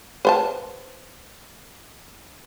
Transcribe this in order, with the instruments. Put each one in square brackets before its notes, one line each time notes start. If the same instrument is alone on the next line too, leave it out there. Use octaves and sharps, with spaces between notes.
[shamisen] B4 C5 A5